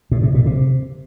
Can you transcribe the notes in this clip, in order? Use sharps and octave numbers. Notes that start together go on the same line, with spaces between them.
A2
C3
A#2
C3